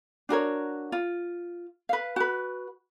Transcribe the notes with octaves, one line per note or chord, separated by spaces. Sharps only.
D4 F#4 A#4 C#5
F4
B4 F5
F#4 B4